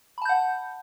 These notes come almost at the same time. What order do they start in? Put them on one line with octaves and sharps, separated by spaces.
B5 A5 G6 F#5